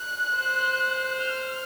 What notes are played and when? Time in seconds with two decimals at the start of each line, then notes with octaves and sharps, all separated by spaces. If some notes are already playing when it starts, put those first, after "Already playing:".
Already playing: F#6
0.37 C5
1.23 F6